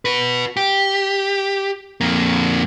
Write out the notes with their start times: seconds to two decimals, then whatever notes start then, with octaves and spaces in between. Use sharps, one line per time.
0.05 F#4 B4
0.57 G4
2.01 F2 A#3